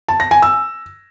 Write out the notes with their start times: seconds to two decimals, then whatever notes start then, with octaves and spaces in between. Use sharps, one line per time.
0.08 A5
0.20 A#6
0.31 G#5
0.42 E6